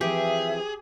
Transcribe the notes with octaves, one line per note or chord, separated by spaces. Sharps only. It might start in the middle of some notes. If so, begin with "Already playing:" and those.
E3 F3 C4 G4 G#4 E5